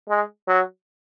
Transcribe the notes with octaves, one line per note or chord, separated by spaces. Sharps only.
G#3
F#3